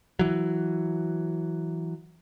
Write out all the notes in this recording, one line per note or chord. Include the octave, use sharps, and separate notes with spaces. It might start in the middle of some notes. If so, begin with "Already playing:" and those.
E3 F#3